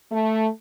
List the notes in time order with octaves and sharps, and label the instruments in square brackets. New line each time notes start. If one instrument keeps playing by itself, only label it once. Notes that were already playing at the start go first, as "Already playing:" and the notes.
[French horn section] A3